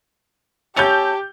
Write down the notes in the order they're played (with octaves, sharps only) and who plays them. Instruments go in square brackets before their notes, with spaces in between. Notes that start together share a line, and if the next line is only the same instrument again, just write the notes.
[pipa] A3 C#4 A4 [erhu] G4 [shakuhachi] A5 [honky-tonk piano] G6 F7